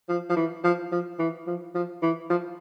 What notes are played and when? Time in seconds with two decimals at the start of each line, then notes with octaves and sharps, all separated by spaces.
0.09 F3
0.30 F3
0.37 E3
0.64 F3
0.92 F3
1.19 E3
1.47 F3
1.75 F3
2.02 E3
2.30 F3